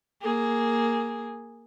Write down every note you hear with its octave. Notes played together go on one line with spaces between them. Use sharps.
A#3 G#4